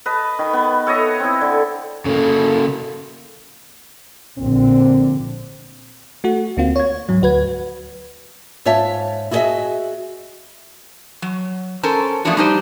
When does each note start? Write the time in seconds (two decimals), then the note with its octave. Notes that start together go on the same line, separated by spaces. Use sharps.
0.06 B4 D#5 A5
0.39 D#3 B5
0.53 B3
0.87 A4 C#5 D#5 E5
1.20 C4 E4
1.41 D3
2.05 C#3 A#3 A4
4.39 A#1 A#2 D3 C4
6.24 A3 F#4
6.57 D2 A#3 C4 F4
6.76 C#5 G#6
7.09 G#2 F#3
7.22 D2 F#4 B4 G#6
8.65 G#2 F4 C#5 E5 A5
9.31 E4 F#4 G#4 A#4 D#5 E5
11.22 F#3
11.83 C#4 A4 A#4 C5
12.25 F3 A3 B3 C#4 D4 F#4
12.37 G3 D4 D#4 G4 C5